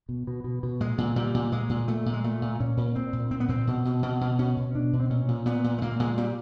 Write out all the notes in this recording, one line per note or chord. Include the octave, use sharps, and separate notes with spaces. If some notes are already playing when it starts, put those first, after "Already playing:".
B2
B2
B2
B2
A#2 G#3
A#2
A#2 G3
A#2
A#2 G#3
A#2
A#2 A3
A#2
G#3
A#2 A3
A#2
A#2 C#4
A#2
A#2 C4
A#2
A#2 C4
B3
A#2 C4
B2
B2
B2
B2
B2 C#4
B2
B2 D4
B2
C4
A#2 C#4
A#2
A#2 B3
A#2
A3
A#2 A#3
A#2 G#3
A#2 G3